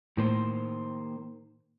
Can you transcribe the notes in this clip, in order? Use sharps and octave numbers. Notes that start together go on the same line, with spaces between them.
A2 D#3 A#3 C5